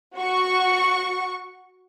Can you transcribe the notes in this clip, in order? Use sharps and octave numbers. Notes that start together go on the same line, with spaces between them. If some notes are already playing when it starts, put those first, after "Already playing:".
F#4 C#6